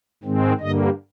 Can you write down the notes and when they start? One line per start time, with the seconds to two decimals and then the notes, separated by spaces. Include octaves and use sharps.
0.23 G#2 D#3 G#3 C4
0.60 G2 D3 G3 A#3 D#5